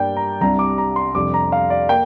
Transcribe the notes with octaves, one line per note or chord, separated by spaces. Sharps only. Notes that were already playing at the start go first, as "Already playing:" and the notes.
Already playing: G2 G3 A#3 D4 D5 G5
A#5
C2 C3 G3 D4 A#5
D6
A#5
C6
F2 C3 G3 D4 D6
A#5
F5
D5
A#3 G5